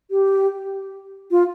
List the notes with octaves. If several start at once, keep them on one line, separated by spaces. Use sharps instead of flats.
G4
F4